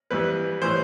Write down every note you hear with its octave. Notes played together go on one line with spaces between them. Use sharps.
F2 E3 G3 B4
A2 E3 G3 C5